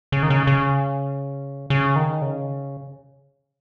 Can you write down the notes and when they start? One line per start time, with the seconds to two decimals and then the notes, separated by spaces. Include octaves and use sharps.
0.12 C#3
0.23 D#3
0.30 C#3
0.47 C#3
1.70 C#3
1.96 D#3
2.22 C#3